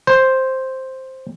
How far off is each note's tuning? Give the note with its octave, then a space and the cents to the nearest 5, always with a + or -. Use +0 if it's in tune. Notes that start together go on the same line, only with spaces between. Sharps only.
C5 +5